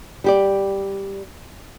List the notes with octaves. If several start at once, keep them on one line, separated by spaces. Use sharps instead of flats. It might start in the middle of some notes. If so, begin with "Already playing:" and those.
G3 G4 D5